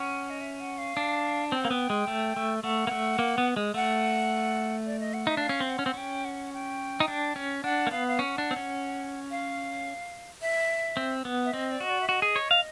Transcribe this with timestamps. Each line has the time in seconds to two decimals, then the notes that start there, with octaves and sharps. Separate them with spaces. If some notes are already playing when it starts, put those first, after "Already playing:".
Already playing: C#4 F#5
0.30 D#5
0.41 E5
0.60 F#5
0.78 F5
0.97 D4
1.52 C4 G5
1.61 A#3 F#5
1.70 B3 G5
1.90 G#3
2.07 A3
2.36 A3
2.63 A3 F#5
2.87 A#3
2.91 A3
3.19 A#3
3.38 B3
3.57 G#3
3.74 A3 F#5
4.86 D5
5.00 D#5
5.14 F#5
5.27 D#4 E5
5.37 D4 F5
5.49 C#4
5.60 C4
5.70 F#5
5.79 C#4
5.86 C4
5.94 C#4 G5
6.25 F#5
6.53 G5
7.00 D#4
7.08 D4
7.36 C#4
7.64 D4 F#5
7.87 A#3
7.91 B3 F5
8.08 F5
8.19 C#4 F#5
8.38 D4
8.51 C4
8.56 C#4
9.31 F5
10.41 E5
10.97 C4
11.25 B3
11.45 E5
11.53 C4 D#5
11.71 D5
11.80 F#4 D#5
11.90 D5
12.01 E5
12.09 F#4 D#5
12.22 G#4
12.36 C#5
12.51 F5